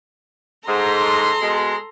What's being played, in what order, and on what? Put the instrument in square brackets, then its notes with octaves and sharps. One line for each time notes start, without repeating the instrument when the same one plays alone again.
[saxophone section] G#2 [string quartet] A4 A#5 C6
[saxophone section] B2 G#3